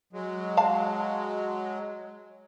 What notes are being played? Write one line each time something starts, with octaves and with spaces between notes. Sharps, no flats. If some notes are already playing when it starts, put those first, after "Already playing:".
F#3 G#3
F5 A5